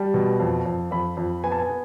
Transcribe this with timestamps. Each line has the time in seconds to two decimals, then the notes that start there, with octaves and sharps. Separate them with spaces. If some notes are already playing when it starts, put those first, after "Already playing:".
Already playing: G3 A5
0.14 B2
0.40 F2
0.65 F2
0.91 F2 B5
1.17 F2
1.44 B3 G#5
1.52 A5
1.59 G#5
1.69 B3